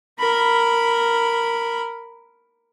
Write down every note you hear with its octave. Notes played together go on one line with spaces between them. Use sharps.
A#4 B5